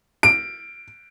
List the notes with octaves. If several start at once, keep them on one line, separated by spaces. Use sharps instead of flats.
D7